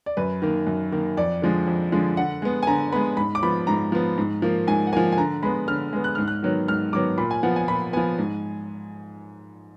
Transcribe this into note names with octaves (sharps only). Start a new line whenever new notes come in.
D5
F#2 B4
D#3 A#3
F#2
D#3 A#3
F2 D5
D3 F3 G#3
F2
D3 F3 G#3
D3 F#5
G#3 B3
G#5
D3 A#5
G#3 B3 B5
G#2 B5
D6
F3 B3 B5
G#2 A#5
F3 B3
G#2
F3 A#3
G#2 G#5
F#5
F3 A#3 G#5
G#5
D3 A#5
G#3 B3 B5
D3 F6
G#3 B3
F#6
G#2 F6
F#6
D#3 F#3 B3
G#2 F6
D#3 F#3 B3 D6
A#2 B5
G#5
F3 B3 F#5
G#5
A#2 B5
F3 B3 G#5
G#2